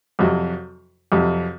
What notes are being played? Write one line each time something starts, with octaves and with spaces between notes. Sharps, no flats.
F2 C3 F#3
F2 C3 F#3